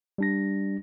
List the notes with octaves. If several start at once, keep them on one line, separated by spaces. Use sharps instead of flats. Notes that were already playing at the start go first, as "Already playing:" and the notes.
G3 D4 A#6